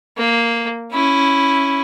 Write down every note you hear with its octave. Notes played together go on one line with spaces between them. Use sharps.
A#3
C#4 E4